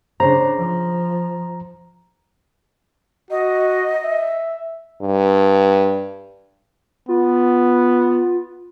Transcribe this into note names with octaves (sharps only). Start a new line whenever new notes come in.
C#3 D4 C5 A#5
F3
F#4 D#5
E5
G2
B3 F4